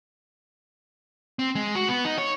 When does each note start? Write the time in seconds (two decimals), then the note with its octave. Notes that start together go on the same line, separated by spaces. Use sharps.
1.39 C4
1.55 G#3
1.75 F#4
1.88 B3
2.05 D#4
2.18 C#5